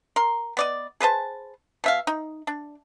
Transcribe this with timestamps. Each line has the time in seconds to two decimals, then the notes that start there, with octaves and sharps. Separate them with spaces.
0.16 A#4 C6
0.57 B3 D5 D#5
1.00 G#4 B4 C5 A5
1.84 B2 E5 F5
2.07 D#4
2.47 D4